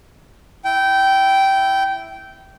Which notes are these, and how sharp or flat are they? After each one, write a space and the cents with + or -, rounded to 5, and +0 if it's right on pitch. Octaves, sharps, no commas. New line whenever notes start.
E4 +0 G5 -15